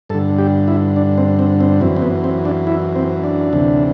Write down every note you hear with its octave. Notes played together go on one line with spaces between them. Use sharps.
G2 D3 A4
G4
E4
D4
C4
C4
C4
F#2 E3 C4
C4
B3
C4
D4
E4
C4
D4
D2 C3 E3